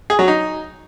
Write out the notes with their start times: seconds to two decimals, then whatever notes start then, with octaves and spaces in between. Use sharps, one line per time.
0.10 G#4
0.19 F#3
0.28 D#4